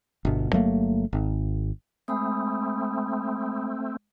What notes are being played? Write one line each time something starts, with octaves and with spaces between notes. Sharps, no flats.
G1 B2
G1 F#3 A3 A#3
G#1
G#3 A3 C4 B5 D#6